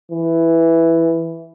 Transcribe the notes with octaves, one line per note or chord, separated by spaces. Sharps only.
E3